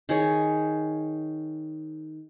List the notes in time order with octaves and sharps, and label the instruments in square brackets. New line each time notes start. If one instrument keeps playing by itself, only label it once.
[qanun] D#3 G#4 C#5